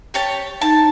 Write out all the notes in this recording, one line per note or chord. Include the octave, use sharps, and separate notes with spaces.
G4 C#5 A5
D#4 A5